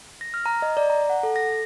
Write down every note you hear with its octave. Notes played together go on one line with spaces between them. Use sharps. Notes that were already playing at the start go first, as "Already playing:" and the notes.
A#6
F6
A#5
D#5
D5
A#5
F#5
A4
A#6
A#6